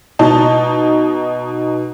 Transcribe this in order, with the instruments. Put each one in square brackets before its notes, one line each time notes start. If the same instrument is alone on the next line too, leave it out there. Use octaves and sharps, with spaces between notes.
[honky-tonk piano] B2 D#4 A5